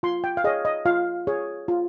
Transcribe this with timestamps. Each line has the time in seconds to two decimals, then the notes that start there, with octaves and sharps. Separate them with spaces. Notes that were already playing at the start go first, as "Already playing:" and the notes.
0.03 F4 C6
0.24 G5
0.37 F5
0.44 G#4 C#5 D#5
0.65 D#5
0.85 F4 F5
1.27 G#4 C#5
1.68 F4